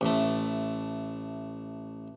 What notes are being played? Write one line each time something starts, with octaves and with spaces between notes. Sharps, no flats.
A1 A3